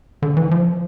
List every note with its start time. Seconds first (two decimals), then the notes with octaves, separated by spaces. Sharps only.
0.22 D3
0.37 E3
0.51 F3